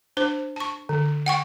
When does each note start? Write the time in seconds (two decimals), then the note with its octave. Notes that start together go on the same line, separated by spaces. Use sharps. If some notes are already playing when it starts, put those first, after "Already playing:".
0.17 D4 C5 D6
0.56 A5 C#6
0.89 D3
1.26 F#5 G5 C#6